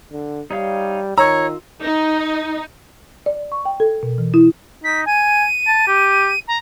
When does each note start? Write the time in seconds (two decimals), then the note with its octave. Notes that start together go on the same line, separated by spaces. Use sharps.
0.12 D3
0.51 G3 D#4 C#5 F5
1.18 D#3 F4 C#5 A#5 E6
1.81 D#4
3.26 D5
3.52 C#6
3.65 G5
3.80 A4
4.03 B2
4.18 E3
4.34 E4
4.84 D#4 B6
5.06 G#5 D#7
5.67 A5
5.88 G4
6.47 A#5